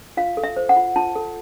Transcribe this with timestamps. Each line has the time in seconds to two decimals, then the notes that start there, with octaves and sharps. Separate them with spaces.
0.17 F4 F5
0.37 A4
0.44 E5
0.56 C5
0.69 F#5
0.76 F4
0.96 F4 A5
1.16 A4